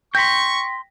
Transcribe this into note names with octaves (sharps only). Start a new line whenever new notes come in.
G5 C6 C#6 G6 A#6 B6